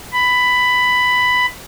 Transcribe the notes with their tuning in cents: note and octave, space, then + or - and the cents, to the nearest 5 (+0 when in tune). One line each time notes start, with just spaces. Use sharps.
B5 +10